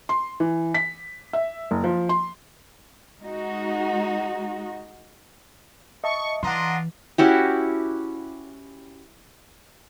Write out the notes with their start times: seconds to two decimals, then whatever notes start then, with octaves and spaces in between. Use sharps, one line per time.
0.09 C6
0.40 E3
0.74 B6
1.33 E5
1.71 F#1
1.84 F3
2.09 C6
3.21 G#3 D#4 F#4
6.04 D#5 E5 A5 C#6
6.43 E3 D4 F4 D#5 F#5 A#5 C6
7.18 C#4 E4 F#4 G4